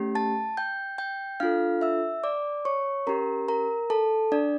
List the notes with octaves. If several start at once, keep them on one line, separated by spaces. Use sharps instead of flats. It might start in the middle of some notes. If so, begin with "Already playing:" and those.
Already playing: A3 C#4 G4
A5 A6
G5 G6
G5 G6
D4 F4 A4 F5 F6
E5 E6
D5 D6
C#5 C#6
C#4 G4 A#4 A#5
A#4 A#5
A4 A5
D4 D5